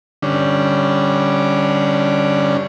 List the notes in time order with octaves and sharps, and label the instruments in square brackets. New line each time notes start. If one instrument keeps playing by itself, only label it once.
[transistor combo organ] D3 G3 C#4 D4